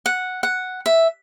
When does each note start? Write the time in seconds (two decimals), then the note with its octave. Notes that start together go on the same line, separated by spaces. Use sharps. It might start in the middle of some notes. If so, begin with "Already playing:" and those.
0.06 F#5
0.43 F#5
0.86 E5